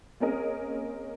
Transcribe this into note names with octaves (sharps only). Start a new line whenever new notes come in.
A#3 C4 C#4 G#4 A#4 D#5